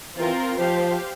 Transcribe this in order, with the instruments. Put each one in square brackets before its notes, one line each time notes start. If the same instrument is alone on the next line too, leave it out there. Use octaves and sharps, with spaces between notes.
[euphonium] E3 [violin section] C4 F4 A#4
[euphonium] F3 [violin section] G4 C5 F5